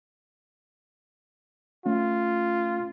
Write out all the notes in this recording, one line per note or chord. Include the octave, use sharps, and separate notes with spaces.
A3 C#4 F4